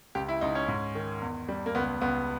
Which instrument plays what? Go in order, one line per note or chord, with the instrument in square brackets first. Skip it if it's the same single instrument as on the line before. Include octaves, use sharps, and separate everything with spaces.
[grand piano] C#2 G4
E4
C#2 D#4
C#4
G#2
D#3
E2
G3
A#3
C#2 B3
C#2 B3